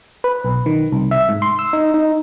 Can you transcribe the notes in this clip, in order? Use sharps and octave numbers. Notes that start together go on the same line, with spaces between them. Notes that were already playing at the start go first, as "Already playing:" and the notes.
B4
B1
D#3
C2
E5
G#2
C6
E6
D#4
D#4